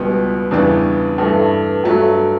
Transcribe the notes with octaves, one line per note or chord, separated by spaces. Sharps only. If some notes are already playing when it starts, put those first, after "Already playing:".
Already playing: C#2 B2 G3 B3
E2 C#3 E3 G3 D4
G2 E3 A3
G2 F#3 A3